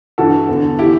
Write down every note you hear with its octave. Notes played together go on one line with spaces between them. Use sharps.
G2 E3 F#4 A4
E2 D3
E3 E4 G4